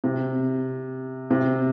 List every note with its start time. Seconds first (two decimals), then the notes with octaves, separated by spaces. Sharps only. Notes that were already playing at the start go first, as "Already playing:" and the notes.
0.04 C3
1.30 C3